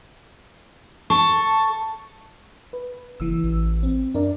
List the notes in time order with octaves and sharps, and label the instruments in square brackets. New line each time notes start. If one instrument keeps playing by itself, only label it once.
[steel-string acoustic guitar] A4 [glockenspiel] C#6
[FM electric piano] B4
[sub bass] F#1 [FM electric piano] E3 E6
[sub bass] A1
[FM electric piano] C4
[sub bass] F#2 [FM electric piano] D4 A#4 D5